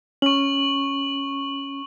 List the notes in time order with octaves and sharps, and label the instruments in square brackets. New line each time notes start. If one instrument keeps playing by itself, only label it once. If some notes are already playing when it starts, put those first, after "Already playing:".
[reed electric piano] C#4 [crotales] C#6 F#7